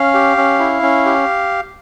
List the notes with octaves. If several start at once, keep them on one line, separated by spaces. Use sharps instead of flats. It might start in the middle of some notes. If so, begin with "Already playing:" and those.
Already playing: C#4 F5
G4
C#4
E4
C#4
G4